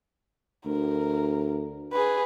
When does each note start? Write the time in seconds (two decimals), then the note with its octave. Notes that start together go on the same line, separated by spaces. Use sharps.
0.66 D2 A#4
1.92 G#4 B4